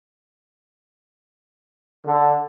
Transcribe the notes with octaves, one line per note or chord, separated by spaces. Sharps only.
D3